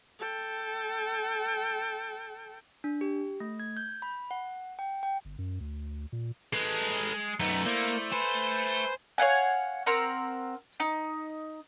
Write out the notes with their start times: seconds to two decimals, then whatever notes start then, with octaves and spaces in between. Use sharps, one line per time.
0.19 A4 G5
2.84 D4
3.01 G4
3.40 A3
3.60 G#6
3.77 G6
4.02 B5
4.31 F#5
4.79 G5
5.03 G5
5.25 G1
5.39 F#2
5.60 D2
6.12 A#2
6.53 G#3 A4 B4
7.40 F#2 A3 B3 D#4 A#5
7.65 A#3 E4 C5 D5
8.12 B4 C5 G#5
9.18 C#5 F5 F#5 G#5
9.86 C4 A#4 F#5
10.80 D#4